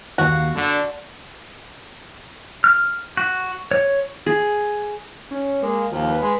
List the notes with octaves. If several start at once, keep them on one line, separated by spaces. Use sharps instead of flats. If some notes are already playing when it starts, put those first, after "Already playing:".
D#2 A#3 F#4
D3 D4
F6
F#4
C#5
G#4
C#4
G#3 A#3
D#2 F3
B4
G#3